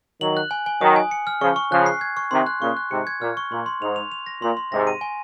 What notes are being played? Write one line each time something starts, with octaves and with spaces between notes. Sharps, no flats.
D#3 F#3 F#7
F#6
G#5
G#5
D#3 F#3 D#6
G#5
C#7
F6
C#3 F3 C#6
C#6
C#3 F3 F#6
C7
G#6
C#6
C3 D#3 C6
F#6
A#2 C#3 C#6
F#6
G#2 C3 C#7
G#6
A#2 F6
C#6
A#2 C6
C6
G#2 F7
F7
F7
A#6
A#2 C6
C6
G#2 C3 A#6
D#7
G#5